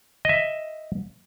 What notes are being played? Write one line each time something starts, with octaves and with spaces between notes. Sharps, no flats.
D#5 E5